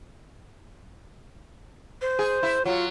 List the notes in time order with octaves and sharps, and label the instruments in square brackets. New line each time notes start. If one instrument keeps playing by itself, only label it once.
[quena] C5
[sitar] G#4
E4
[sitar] F#3 [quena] F4